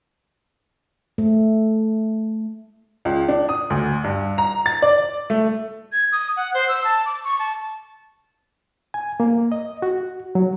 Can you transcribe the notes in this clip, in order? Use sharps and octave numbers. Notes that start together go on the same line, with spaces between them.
A3
C#2
D4
D#6
D2
G2
A#5
A6
D5
A3
G#6
D#6
F#5
C5
E6
A5
D6
C#6
A5
G#5
A#3
D#5
F#4
F#3